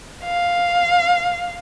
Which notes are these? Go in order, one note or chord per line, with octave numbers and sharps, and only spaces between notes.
F5